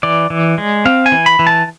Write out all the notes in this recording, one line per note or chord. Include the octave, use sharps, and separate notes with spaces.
E3 D5
E3
G#3
C4 F5
G#5
E3
B5
E3
A5